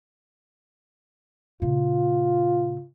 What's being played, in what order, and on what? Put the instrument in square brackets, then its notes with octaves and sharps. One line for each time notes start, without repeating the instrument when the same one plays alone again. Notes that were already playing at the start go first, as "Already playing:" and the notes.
[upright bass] A#2 C#3 [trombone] F4